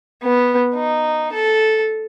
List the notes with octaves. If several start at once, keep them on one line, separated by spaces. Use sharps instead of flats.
B3
D#4
A4